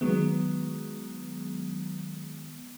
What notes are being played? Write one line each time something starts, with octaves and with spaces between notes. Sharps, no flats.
D#3 F#3 G#3 B3